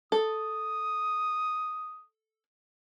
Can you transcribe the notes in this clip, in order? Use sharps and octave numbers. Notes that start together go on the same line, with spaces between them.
A4 D#6